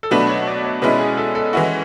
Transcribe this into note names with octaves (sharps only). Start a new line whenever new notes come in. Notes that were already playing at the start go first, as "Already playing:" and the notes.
A4
B2 F#3 A3 D4 F#4 B4
C#5
D5
C#5
B2 G#3 C#4 E4 B4
G#4
A4
A4
E3 G#3 C#4 E4 F#4